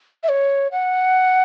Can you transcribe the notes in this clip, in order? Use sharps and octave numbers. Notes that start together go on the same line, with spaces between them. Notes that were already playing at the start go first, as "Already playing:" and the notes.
E5
C#5
F#5